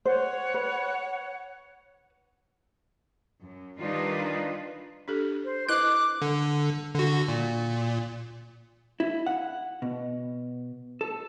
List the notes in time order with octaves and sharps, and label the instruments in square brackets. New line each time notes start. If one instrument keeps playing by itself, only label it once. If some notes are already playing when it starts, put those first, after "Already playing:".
[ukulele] C5 [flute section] C#5 F#5
[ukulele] B4
[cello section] F#2
D#3 G3 D4 D#4 F4 B4
[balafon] D4 G4 A4
[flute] C5
[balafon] E4 B4 D#5 [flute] D6 [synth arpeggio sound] F#6
[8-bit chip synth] D3
D3 F#4
A#2
[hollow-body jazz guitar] E4
F#5
B2
A4